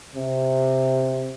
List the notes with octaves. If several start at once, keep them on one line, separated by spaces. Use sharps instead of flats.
C3